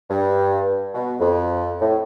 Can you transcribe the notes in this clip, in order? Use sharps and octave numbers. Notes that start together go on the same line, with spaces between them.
G2
B2
F2
A2